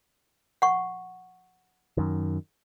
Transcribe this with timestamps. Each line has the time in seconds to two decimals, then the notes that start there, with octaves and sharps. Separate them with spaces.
0.62 F#5 C#6
1.97 F#2 D#3